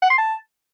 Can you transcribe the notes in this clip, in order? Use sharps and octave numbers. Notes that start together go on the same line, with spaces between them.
F#5
C6
A5